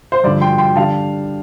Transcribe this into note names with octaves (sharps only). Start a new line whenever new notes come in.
C5
G2 D3 F3 D5
G5 C6
G5 C6
D3 G3 D4 F5 A5